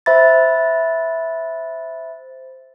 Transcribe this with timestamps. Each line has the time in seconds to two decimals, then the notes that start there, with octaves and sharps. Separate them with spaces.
0.06 C5 E5 B5 A6